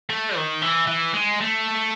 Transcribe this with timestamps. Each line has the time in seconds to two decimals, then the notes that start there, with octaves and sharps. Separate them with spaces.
0.10 A3
0.36 D#3
0.62 E3
0.87 E3
1.14 G#3
1.41 A3